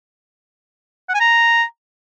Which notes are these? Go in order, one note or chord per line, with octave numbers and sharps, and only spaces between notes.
F#5
G#5
A#5